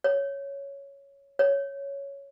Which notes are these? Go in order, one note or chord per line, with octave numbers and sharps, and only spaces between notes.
C#5
C#5